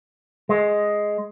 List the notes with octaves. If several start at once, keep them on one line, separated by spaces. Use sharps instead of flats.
G#3